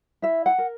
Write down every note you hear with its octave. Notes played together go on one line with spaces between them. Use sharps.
E4 E5
F#5
A#4